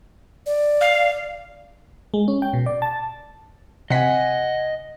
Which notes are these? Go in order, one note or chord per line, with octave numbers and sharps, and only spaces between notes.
D5
F5
G#3
C#4
G5
B2
D5
A5
C3 D#5 F#5 G#5 B6